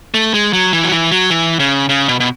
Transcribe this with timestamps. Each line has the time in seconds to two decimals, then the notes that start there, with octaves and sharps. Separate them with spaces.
0.14 A3
0.34 G#3
0.53 F#3
0.73 E3
0.84 F#3
0.92 E3
1.12 F#3
1.30 E3
1.60 C#3
1.89 C#3
2.08 B2
2.20 B2